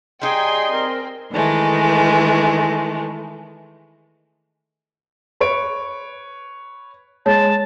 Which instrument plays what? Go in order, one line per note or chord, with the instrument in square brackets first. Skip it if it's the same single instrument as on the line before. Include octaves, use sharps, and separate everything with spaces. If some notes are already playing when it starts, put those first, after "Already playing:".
[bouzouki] G3 D#4 [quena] G#4 [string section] G5 G#5 [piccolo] C6
[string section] C4 [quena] A#4
[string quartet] D#3 E3 G#3 A3
[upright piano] B4 C#5 D7
[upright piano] G#3 [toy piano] C#5 [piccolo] A5